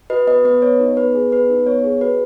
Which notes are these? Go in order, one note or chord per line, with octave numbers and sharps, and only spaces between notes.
F#4 B4 D#5
B3 B4 D#5
B3 B4 D#5
B3 C#5
D#4
B3 B4
G#4
B3 B4
D#4
B3 C#5
G#4
F#4 B4